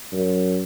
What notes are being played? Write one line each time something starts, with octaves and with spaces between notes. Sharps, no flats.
F#2